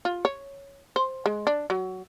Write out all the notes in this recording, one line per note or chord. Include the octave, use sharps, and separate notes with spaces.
F4
C#5
C5
G#3
D4
F#3